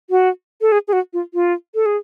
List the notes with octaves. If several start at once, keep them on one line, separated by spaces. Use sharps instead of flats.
F#4
A4
G#4
G#4
F#4
F4
F4
A4
G#4